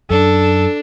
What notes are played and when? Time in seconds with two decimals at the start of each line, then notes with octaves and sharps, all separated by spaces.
0.10 F#2 D4 A4